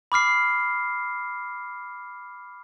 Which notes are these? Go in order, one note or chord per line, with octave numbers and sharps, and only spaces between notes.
B5 D6 F6 C7